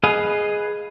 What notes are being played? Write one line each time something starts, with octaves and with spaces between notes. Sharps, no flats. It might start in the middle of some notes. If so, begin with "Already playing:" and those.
G#4 B4 D#5 F5